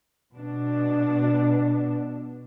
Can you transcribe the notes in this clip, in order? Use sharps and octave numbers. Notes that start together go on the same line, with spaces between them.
B2 D4